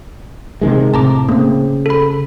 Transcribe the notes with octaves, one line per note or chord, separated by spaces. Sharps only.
C3 D#3 G#3
A2 C3 A5 A#5 D6
C#3 A3 A#3 C4
A4 B5